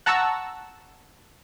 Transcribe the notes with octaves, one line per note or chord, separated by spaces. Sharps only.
F#5 A5 A#5 C#6 E6